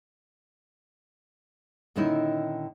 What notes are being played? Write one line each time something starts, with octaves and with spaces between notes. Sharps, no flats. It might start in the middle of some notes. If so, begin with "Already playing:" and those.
A#2 D3 D#3 C#4 D#4 E4